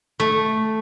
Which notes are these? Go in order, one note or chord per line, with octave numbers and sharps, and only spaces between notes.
A3